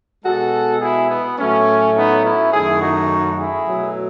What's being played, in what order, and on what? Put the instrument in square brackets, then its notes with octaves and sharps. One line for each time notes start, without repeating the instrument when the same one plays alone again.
[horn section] B2 G#3 F#4 A4
E4 G#4
B3
A2 F#3 A3 C#4
B3 D#4
C#4 E4
F#2 D#3 A3 E4 G#4
D#4 F#4
E4 G#4
B2 F#3 A3